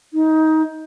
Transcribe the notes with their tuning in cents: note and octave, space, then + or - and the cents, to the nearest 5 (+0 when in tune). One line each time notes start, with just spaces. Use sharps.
D#4 +20